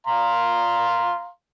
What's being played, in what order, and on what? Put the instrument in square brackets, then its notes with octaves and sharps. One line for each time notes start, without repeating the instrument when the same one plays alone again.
[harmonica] F5 A#5 C6